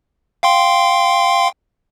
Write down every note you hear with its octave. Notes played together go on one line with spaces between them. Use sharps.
F5 G5 C6